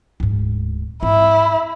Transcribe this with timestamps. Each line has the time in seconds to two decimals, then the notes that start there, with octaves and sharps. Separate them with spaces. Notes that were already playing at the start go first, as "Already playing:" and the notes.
0.20 D1 G#2
1.03 G#2 C4 E4